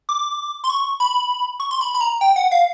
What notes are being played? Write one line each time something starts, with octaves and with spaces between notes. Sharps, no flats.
D6
C6
C#6
B5
C#6
C6
B5
B5
A#5
G5
F#5
F5